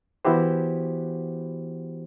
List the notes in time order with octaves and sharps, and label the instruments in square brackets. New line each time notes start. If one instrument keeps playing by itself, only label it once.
[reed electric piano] E3 B3 E4 F#4 G4 C5